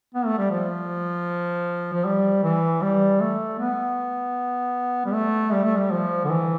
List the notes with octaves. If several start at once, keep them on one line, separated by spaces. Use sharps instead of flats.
B3
A3
G3
F3
F3
G3
E3
G3
A3
B3
G3
A3
G3
A3
G3
F3
D3
E3